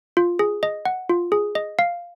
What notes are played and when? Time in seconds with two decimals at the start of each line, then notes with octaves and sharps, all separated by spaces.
0.17 F4
0.39 G#4
0.63 D#5
0.85 F#5
1.09 F4
1.32 G#4
1.55 D#5
1.79 F5